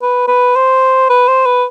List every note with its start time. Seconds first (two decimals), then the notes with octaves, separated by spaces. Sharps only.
0.02 B4
0.28 B4
0.56 C5
1.09 B4
1.28 C5
1.45 B4